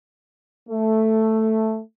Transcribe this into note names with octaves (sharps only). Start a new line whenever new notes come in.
A3